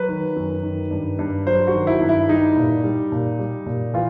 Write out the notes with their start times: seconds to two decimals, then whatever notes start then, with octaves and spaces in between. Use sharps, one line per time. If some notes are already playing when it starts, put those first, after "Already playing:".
Already playing: F#3 B4
0.09 D#3
0.36 F#2
0.63 D#3
0.91 G2
1.19 G2
1.47 F#3 C5
1.67 F#4
1.74 D#3
1.87 E4
2.01 G2
2.09 E4
2.28 G3 D#4
2.57 A#2
2.84 G3
3.12 A#2
3.39 G3
3.66 A#2
3.94 E3 F4